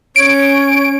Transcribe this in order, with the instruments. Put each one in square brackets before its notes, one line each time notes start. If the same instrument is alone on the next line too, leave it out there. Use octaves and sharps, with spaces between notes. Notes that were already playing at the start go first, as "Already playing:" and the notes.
[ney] C#4 [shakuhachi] C#5 [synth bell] D7